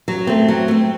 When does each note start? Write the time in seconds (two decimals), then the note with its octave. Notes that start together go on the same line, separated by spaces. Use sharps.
0.08 F#3
0.27 A3 C4
0.48 F#3
0.68 A3 C4